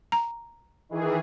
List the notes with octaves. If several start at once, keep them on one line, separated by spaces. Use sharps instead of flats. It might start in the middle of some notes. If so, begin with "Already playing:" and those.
A#5
D#3 E3 G#4